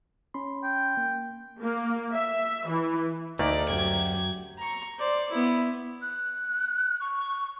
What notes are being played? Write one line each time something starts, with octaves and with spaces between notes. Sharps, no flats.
C#4 B5 C6
G5
A#3
A#3
E5
E3
D2 A3 A#3 D#4 D5
F#2 G4 G#6
A#5 C#6
C5 D5
B3 E4
F#6
C#6